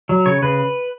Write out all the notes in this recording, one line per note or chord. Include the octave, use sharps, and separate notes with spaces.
F#3
C#3 C#5
C#3 B4